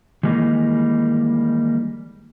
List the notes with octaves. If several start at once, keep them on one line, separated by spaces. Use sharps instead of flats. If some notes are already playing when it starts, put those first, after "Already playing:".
D#3 E3 G3 G#3 A#3 D#4